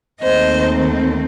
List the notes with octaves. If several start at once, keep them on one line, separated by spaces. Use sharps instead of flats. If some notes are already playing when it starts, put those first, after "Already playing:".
D#2 D#3 A3 C4 C5 D#5